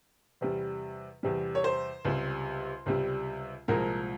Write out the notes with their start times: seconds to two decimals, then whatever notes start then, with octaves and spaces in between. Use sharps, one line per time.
0.41 E2 C3 G3
1.23 E2 C3 G3
1.55 C#5
1.64 C5
2.05 C#2 C3 G3
2.86 C#2 C3 G3
3.68 C2 A#2 F3 G#3 A#4